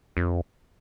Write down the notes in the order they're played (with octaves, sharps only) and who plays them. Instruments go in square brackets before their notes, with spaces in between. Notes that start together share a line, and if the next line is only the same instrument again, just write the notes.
[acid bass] F2